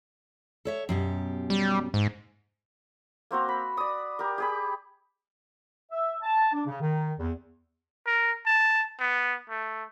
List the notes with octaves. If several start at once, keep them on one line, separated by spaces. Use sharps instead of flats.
A4 C#5 E5
F#2 B2 G4
G3
G#2
A#3 C4 F#4 A#5
B5
D5 D#6
G4 A#4
G4 G#4 B5
E5
A5
D4
C#3
D#3
E2
A#4
A5
B3
A3